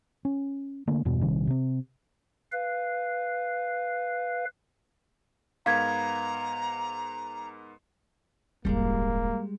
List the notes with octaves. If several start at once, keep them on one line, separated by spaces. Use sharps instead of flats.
C#4
D3 A3 A#3
E2 G2 B2
A#1 C3 D#3 G3
C3 C4
B4 F5
G#2 B3 A#4 F5 A#5 G#6
D#1 G#1 G3 G#3 A#3